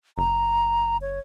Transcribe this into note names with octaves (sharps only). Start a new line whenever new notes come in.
F#1 A#5
C#5